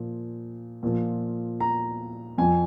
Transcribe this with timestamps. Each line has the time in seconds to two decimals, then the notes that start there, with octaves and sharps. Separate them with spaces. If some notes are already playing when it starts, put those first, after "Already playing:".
Already playing: A#2 F3
0.83 A#2 F3
1.60 A#5
2.38 F2 F3 G#5